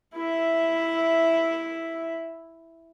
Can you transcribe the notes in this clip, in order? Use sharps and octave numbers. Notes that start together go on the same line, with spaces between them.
E4 E5